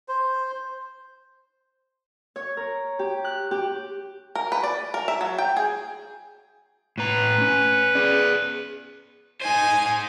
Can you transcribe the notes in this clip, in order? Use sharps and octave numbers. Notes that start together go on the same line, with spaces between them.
C5
C#5
A#4
G4
F#6
G4
A#4
B4
D5
A#4
E5
F#3
G5
G#4
A2 B4 A#5
C#4
G#4 D5
D#4 C5 G#5